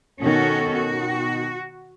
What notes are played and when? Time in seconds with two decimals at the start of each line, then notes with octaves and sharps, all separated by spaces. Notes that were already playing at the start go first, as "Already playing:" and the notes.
0.21 B2 D#3 C#4 F#4 A4
0.74 F#4